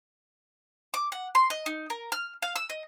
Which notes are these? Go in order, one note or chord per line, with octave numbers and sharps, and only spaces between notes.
D6
F#5
C6
D#5
D#4
A#4
F6
F5
E6
D#5